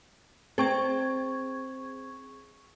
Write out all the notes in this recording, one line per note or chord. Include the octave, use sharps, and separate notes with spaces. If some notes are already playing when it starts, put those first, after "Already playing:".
C4 G#4 C#6 G#6